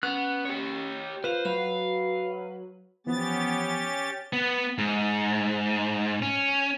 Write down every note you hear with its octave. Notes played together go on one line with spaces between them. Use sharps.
B3 C#4 F#6
G4 C#5
F4 B4 C5 F5
F#3 F5 B5
E3 F3 B3 C#4 G4 A6
B3
G#2
C#4